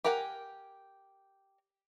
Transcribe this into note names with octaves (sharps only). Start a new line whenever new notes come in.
G4 A#4 F5 F#5 G#5